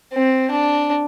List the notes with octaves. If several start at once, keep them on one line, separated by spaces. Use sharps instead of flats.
C4
D4